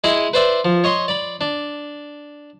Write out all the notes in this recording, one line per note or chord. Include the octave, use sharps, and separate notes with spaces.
G#3 E4 G#4 D#5
B4 C5 D5 E5
F3
C#5 D#5 C6
D5 B5
D4